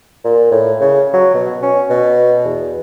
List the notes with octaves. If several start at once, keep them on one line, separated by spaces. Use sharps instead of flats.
A#2
A2
C#3
F#3
B2
C#4
B2
E2